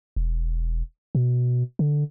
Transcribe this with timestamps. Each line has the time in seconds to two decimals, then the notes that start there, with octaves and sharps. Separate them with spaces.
0.16 E1
1.15 B2
1.79 D3